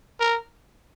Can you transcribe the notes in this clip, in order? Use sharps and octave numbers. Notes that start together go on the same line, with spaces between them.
A#4